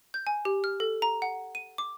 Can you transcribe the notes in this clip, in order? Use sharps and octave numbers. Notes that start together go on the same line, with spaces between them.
G6
G#5
G4
F6
A4
A#5
F#5
D#7
D6